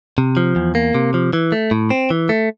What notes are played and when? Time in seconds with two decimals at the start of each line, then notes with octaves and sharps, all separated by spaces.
0.18 C3
0.37 F3
0.56 E2
0.75 A#3
0.95 C3
1.14 F3
1.33 E3
1.52 A3
1.71 A2
1.90 C4
2.10 E3
2.29 A3